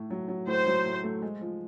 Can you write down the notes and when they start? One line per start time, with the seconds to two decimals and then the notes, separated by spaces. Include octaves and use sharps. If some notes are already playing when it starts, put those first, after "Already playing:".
Already playing: A2 A3
0.10 F#3
0.28 F#3
0.47 A2 C5
0.66 F#3
0.86 A2
1.04 A3
1.22 G#3
1.41 F3